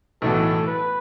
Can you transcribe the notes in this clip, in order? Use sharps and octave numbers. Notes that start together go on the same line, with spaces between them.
B1 A2 E3 B3 A4
B4